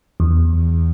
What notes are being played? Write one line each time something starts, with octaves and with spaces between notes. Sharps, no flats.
E2